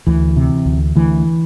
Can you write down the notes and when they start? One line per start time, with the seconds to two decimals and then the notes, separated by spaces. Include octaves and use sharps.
0.07 D2 E3
0.36 C3
0.66 D2
0.96 D2 E3